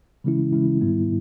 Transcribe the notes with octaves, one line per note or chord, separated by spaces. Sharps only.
C#3 E3 G#3 C#4 E4
C#3 E3 G#3 C#4 E4
G#2 D#3 G3 B3 E4